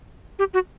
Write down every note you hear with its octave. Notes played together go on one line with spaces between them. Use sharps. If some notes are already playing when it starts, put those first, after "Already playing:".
G4
F#4